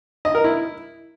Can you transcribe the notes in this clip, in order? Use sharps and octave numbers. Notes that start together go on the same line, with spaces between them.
D#5
A#4
E4